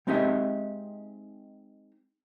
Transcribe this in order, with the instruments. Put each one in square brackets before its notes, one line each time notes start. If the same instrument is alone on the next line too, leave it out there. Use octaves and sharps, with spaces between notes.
[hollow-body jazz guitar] G#3 C4 D#4 G4 D#5 E5